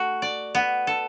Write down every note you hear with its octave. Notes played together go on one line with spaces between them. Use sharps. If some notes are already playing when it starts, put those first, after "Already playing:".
Already playing: A3 F#4
D5
B3
A4